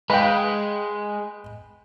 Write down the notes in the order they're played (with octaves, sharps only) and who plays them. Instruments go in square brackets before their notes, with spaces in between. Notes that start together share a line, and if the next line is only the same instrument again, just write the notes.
[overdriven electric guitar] G#3 [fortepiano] B4 F5 G5